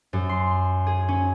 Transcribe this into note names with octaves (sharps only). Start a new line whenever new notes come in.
F#2
C6
G#4
C#4